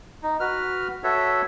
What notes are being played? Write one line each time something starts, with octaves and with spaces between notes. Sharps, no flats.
D#4
F#4 B4 F6
F#4 A4 B4 C#5 E5